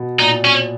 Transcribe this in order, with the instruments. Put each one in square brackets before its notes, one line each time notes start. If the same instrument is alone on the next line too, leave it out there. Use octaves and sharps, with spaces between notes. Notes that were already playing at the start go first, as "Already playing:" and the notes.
Already playing: [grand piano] B2
[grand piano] A#2 [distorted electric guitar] D#4
[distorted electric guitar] C#4